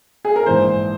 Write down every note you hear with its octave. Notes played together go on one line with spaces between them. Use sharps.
G#4
A#4
A#1 G#2 E3 C5